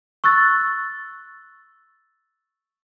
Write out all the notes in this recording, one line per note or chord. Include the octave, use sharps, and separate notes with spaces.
C#6 E6 F#6 A6